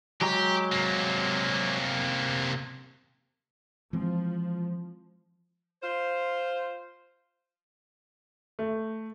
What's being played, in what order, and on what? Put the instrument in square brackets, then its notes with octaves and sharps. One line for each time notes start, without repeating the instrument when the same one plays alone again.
[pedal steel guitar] F#3 G#3 A#5 [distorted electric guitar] G4
[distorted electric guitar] C3 A#3
[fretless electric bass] E3 G#3 C4 [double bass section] F3
[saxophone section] F4 C5
[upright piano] A3